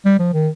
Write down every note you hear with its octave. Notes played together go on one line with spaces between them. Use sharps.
G3
F3
D#3